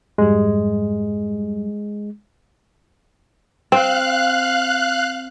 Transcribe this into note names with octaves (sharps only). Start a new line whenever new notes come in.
F2 G#2 G3 G#3
C4 F5 F#6